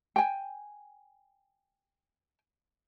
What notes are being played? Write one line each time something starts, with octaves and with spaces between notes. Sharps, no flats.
G5 G#5